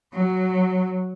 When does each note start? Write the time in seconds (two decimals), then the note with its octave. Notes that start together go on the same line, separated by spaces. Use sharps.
0.13 F#3